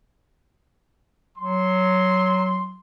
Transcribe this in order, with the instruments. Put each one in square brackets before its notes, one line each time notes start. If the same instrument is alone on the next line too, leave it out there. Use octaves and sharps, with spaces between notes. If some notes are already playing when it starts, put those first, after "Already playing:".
[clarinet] F#3 [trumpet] C6